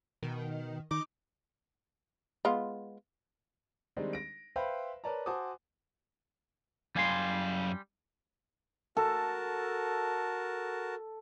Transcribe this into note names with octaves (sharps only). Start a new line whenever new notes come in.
B2 D#3
D#3 D#4 D6
G#3 B3 F4
D#3 G3 G#3 C4 D4 D#4
A#6 D7
B4 C5 E5 F5 G5 B5
A#4 B4 C#5 D5 A5 A#5
F#4 C5 G#5 A5 D6 D#6
F#2 G3 F5 G#5 C6
F#4 A4 A#4 A5